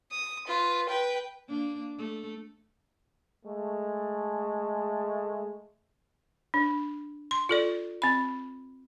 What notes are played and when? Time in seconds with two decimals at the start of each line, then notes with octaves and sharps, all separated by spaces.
0.11 D#6
0.47 F4 B4
0.88 B4 G5
1.48 A#3 D4
1.98 A3
3.46 G#3 A3
6.54 D4
7.31 C6
7.49 F4 A4 D5
8.02 C4 B5